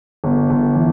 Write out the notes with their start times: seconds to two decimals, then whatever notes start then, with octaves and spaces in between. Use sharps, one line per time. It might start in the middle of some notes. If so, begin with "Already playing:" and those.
0.24 G1
0.50 G1
0.75 E3